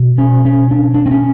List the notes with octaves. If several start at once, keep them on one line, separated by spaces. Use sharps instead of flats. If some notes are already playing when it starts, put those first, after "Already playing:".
Already playing: B2
C#4
C#4
D4
D4
C4
C#4